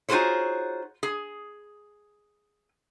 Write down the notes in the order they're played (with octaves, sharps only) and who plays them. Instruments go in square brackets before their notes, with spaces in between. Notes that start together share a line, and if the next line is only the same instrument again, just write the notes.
[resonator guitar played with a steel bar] D#4 F4 F#4 G#4 C5 C#5
G#4